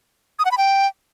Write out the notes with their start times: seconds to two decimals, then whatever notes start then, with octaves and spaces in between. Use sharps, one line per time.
0.39 D#6
0.45 F#5
0.51 B5
0.58 G5